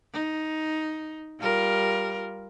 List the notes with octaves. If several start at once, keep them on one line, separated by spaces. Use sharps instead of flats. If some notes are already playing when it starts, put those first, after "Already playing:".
D#4
G3 F4 A#4